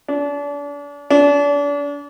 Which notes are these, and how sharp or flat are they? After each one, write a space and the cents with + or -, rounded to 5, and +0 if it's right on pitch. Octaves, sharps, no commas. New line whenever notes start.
D4 -35
D4 -35